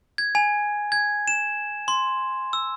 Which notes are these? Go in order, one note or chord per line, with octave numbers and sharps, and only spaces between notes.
G#6
G#5
G#6
E7
C6
E6